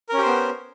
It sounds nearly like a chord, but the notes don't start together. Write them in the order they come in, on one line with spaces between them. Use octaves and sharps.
A#4 C#4 G4 C5 B3